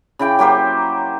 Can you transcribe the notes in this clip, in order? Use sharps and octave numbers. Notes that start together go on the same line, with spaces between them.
C#3 E4 G5 D6
F#3 A#3 G4 C5